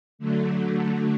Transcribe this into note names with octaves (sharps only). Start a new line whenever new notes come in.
D3 F#3 A3